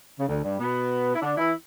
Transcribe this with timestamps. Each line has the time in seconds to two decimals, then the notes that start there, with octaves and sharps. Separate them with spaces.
0.19 C#3
0.28 D2 D3
0.44 G2 G3
0.60 B2 B3
1.15 E4
1.22 D3 D4
1.37 E3 E4